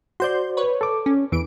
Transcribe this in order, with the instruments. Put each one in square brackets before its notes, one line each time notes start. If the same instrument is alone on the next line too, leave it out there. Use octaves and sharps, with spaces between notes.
[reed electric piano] F#4 C5 D5 [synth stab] C6 G6
[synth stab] B4 C#5
[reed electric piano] A4 D6
[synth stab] C#4
[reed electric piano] E2 [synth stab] E3 D7